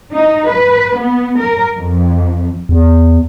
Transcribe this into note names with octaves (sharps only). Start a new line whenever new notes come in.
D#4
B4
B3
A#4
F2
E2